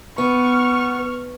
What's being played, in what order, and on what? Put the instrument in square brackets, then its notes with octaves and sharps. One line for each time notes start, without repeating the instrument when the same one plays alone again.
[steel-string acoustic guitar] B3 [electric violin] C#6 F6